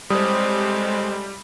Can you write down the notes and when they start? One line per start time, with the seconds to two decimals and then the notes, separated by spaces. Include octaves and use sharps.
0.10 A2 C3 G3 G#3 C5 D#6